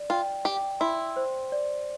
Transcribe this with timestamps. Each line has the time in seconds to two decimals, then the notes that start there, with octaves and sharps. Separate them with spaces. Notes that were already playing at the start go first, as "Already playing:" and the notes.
Already playing: D5
0.10 F4 G5
0.45 G4 G5
0.80 E4 C6
1.16 C5
1.52 D5